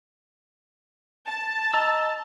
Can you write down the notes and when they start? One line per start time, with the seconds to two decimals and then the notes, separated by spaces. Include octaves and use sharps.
1.26 A5
1.74 D#5 A#5 E6